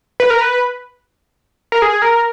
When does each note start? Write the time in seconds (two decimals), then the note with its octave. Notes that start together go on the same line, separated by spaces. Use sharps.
0.20 B4
0.30 A#4
0.41 B4
1.72 A#4
1.82 G#4
2.02 A#4